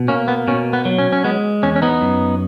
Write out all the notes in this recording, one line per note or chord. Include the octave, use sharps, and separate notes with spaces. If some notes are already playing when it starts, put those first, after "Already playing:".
Already playing: B2
A#3 C#4
B3
B2 C#4
B3
F#3
C#4
C#4
G#3 B3
E2 C#4
C#4
B3 D#4
F#2